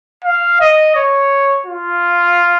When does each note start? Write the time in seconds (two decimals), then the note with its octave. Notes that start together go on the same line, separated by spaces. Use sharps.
0.24 F5
0.61 D#5
0.96 C#5
1.67 F4